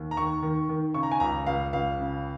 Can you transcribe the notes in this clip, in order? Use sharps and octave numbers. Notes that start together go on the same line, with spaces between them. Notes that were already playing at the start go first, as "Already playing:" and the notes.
Already playing: D#2
A#5
D#3 C#6
D#3
D#3
C#3 C#6
A#5
G#5
C#2 A#5
C#2 F5
C#2 F5
C#3